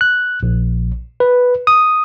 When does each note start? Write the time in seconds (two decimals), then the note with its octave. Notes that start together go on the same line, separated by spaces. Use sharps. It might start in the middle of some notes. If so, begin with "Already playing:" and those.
0.01 F#6
0.43 A#1
1.20 B4
1.67 D#6